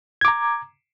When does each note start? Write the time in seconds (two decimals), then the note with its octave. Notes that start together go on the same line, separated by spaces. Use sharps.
0.21 G#6
0.25 D6
0.28 A#5